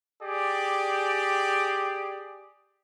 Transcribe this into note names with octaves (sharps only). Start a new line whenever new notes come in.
G4 G#4 D5